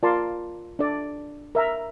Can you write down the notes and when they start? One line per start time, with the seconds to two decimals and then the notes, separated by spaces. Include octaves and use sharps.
0.03 F4 A#4 D5 A5 C6
0.79 D4 A4 D5
1.55 A#4 E5 A#5